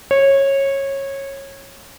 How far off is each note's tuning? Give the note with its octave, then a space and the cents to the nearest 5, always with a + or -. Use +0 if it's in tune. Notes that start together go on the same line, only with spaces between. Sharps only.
C#5 -20